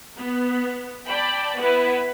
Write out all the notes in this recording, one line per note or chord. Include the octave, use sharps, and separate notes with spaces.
B3
D5 G5 A5 B5
B3 E4 B4